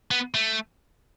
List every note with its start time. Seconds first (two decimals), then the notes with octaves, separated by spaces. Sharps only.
0.11 B3
0.34 A3